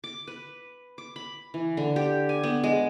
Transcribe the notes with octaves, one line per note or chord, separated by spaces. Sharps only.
D6
B4
D6
B5
E3
D3
G4
G#5
B3
G#3